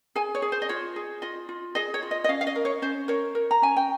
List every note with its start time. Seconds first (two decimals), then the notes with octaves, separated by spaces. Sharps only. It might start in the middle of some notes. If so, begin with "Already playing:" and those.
0.15 G#4 G#5
0.35 C#5
0.42 G#4
0.52 C5
0.62 D#5
0.69 F4 C#5
0.96 G#4
1.22 F4 D#5
1.49 F4
1.75 G#4 D#5
1.94 C#5
2.03 F4
2.11 D#5
2.24 D#5
2.29 C#4 F5
2.41 F5
2.47 D#5
2.56 A#4
2.65 C#5
2.82 C#4 C5
3.08 A#4 C#5
3.35 A#4
3.51 A#5
3.62 C#4 G#5
3.77 G5